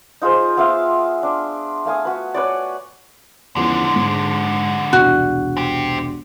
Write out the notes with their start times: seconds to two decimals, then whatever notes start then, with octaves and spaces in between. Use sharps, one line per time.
0.22 D#4 F4 G#4 C5
0.57 B3 F4 E5 F5
1.23 D4
1.85 A3 F5 G#5 D#6
2.05 F#4 B4
2.34 B4 C#5 D5
3.56 E2 D3 F3 G#3 C#4
3.96 G#2
4.93 E1 C2 D4 F#4
5.57 C4 G4